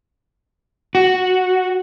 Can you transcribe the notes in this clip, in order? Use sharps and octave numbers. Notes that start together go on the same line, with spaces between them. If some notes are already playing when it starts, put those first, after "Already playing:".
F#4